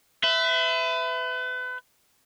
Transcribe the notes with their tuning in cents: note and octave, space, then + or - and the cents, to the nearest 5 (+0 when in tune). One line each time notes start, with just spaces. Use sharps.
B4 +35 E5 +0